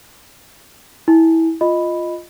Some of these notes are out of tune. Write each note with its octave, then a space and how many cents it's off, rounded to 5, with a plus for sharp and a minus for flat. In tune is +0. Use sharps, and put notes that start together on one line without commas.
E4 -20 G#5 +0
F4 +0 D#5 +0 B5 +0